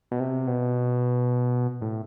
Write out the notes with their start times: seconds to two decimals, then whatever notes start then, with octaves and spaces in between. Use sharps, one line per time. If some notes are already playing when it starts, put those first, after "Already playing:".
0.11 B2
0.20 C3
0.47 B2
1.81 A2